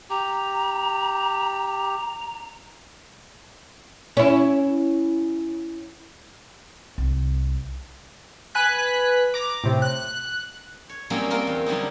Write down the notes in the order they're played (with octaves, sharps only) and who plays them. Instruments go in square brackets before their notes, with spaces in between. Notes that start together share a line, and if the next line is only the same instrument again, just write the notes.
[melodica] G4 [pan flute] A#5
[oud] C#4 E4
[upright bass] C2
[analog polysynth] B4 G#5 F#6 B6
A#5 D6
A2 C3
F#6
[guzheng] C#5
F#3 G3 A#3 C4 C#4 D#4
A#3 C4 F4 A#4
E2
D3 F#3 G3 D#4